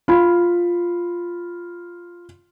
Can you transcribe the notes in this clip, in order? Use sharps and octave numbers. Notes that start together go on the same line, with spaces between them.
F4 B5